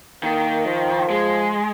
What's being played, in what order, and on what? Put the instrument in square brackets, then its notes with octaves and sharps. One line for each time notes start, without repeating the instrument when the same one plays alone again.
[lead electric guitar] D#3 [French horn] A#3
[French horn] F3
[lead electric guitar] G#3